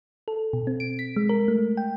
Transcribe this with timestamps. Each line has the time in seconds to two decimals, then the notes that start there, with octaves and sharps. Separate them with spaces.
0.28 A4
0.53 B2
0.67 C4
0.80 D7
0.99 B6
1.16 G#3
1.29 A#4
1.48 A3
1.77 G5